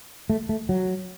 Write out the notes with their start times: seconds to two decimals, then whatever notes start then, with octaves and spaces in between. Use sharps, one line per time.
0.30 A3
0.49 A3
0.69 F#3